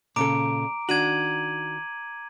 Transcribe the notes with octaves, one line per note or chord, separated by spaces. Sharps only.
A#2 C#3 A4 A#5 D6 D7
D#3 D4 F#4 G#6 D#7 F#7